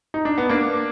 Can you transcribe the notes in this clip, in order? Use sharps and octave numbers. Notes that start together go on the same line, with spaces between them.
D#4
D4
B3
A#3 D4